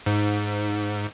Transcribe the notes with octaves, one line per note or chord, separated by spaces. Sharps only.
G#2